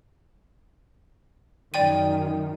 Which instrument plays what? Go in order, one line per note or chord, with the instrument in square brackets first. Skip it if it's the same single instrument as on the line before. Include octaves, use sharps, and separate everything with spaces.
[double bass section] F#2 D#3 [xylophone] D5 G5 D#7